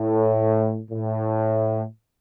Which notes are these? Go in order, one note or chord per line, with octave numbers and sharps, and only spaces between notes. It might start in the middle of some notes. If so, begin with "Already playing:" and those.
Already playing: A2
A2